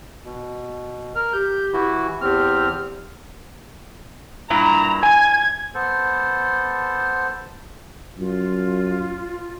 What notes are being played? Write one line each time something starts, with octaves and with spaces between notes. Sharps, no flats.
B2
A#4 F6
G4 G6
E3 E4 F#4
E2 C4 G4 F6
G2 A#2 E4 A#5
G#5 G#6
B3 A4 C5
F#2 F4